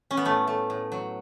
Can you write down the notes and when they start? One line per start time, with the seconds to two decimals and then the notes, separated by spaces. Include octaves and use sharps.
0.11 C#4
0.17 B3
0.25 A2 A3
0.47 A3
0.70 A2
0.92 F#3